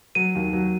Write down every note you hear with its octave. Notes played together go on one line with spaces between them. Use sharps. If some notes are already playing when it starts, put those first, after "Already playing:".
F#3 D#7
D#2
F#3